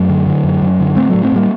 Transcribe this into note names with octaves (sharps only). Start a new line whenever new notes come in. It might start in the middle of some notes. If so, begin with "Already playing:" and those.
Already playing: F#2 F#3 A3
D3
D3
F#2
F#2
D3
A2 A3 C4
A2 F#3 A3
A3 C4
A2 G3 A#3